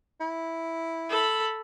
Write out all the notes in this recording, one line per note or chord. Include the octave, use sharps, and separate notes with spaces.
E4
A4 B5